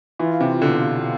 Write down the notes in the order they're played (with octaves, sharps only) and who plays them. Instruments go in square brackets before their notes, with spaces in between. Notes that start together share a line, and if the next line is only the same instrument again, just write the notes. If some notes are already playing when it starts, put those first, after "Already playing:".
[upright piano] E3 [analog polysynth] F4
[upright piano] C3
[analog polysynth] B2 [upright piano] D3